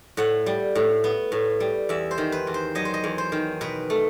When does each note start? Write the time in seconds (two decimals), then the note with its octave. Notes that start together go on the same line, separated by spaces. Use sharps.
0.17 A2 F#5
0.46 G3
0.75 A2
1.04 B3
1.32 A2
1.60 G3
1.89 E2 E5
2.11 C5
2.18 D#3
2.32 B4
2.47 E2
2.54 C5
2.75 F#3 D#5
2.85 C5
2.94 D#5
3.04 E2
3.18 C5
3.32 D#3
3.61 B2 B4
3.90 A3